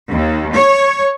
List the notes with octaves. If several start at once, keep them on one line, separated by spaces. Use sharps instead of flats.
D#2
C#5